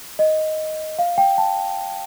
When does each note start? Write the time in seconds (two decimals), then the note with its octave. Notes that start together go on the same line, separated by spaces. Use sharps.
0.19 D#5
0.99 F5
1.18 G5
1.38 A5